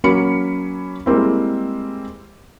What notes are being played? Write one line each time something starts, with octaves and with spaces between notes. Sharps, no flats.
F#3 A#3 C#4 B5 C#7
G3 G#3 A#3 C4 E4